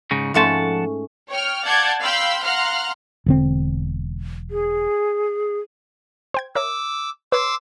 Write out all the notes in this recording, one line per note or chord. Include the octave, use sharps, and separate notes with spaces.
G#2 C#3 D#4
G#2 F3 A3 C#4 F#5 A5
C#5 G5 F6
D5 F5 F#5 A5 G6 G#6
F5 G5 B5 C6 E6 G6
F5 F#5 A#5 C6 F6 F#6
E1 D3 C4
G#4
C5 G5 G#6
A#4 C#5 E5 D6 E6
B4 C#5 C6 D6 E6